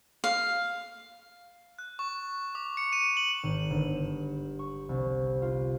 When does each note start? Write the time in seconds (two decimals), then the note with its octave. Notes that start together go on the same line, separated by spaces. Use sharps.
0.24 F5
1.79 F#6
1.99 C#6
2.55 D6
2.77 C#7
2.93 D#7
3.17 F#7
3.43 G#1
3.70 G1
3.96 E7
4.59 C#6
4.89 C2
5.42 F4